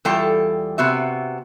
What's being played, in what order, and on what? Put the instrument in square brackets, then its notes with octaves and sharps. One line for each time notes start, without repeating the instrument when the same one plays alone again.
[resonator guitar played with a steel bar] E2 G3 F4 A4 G5
C3 B3 F#4 E5